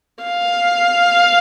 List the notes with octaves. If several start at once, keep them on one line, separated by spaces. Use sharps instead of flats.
F5